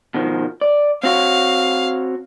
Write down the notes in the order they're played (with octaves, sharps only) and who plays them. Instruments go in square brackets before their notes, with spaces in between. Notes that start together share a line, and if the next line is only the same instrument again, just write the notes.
[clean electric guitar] B2 D#3 F3
D5
[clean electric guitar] C4 F#4 C#5 [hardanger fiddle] F5